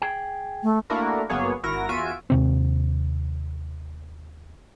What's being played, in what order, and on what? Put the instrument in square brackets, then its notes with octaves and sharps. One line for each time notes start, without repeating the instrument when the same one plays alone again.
[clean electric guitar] G#4 G5
[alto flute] A3
[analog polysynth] A3 A#3 D4 E4 F#4 A#4
G1 F#3 A#3 B3 G#4 C#5
G#1 E4 F#4 A#4 A#6
E2 F4 F#4 E5 G#5 D7
[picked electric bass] D#2 C3 C4